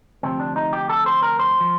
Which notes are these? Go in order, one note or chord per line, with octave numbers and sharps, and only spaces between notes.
D2 C3 F3 C4
D4
D#4
G4
A4
C5
A#4
C5
F3